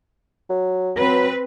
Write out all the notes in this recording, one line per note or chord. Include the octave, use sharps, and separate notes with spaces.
F#3
F#3 C4 B4